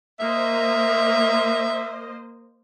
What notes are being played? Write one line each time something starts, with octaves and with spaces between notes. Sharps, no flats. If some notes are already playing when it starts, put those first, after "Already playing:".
A#3 C5 D#5 E5